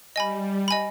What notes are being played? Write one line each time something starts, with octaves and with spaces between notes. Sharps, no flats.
G3 D#5 G#5 B5
D#5 G#5 B5